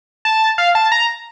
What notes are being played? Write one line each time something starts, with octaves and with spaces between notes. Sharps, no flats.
A5
F5
A5
A#5